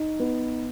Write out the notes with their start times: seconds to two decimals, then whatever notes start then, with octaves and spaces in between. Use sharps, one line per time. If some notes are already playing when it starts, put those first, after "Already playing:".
Already playing: D#4
0.20 B3